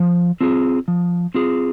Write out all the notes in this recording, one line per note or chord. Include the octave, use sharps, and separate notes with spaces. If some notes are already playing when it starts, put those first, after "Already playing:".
Already playing: F3
C4 F4 G#4
F3
C4 F4 G#4